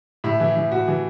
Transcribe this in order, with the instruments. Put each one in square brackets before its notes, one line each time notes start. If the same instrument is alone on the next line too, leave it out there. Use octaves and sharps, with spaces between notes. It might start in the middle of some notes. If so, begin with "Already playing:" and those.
[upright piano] A2 E4
E3
E3
A2 F#4
E3